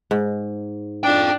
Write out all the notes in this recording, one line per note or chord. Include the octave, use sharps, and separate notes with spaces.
G#2
D4 F4 G5